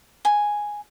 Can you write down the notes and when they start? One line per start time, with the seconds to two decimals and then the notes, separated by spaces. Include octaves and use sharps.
0.25 G#5